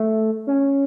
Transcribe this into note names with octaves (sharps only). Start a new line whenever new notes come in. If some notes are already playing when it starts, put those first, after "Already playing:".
Already playing: A3
C#4